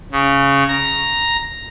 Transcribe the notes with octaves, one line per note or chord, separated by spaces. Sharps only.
C#3
A#5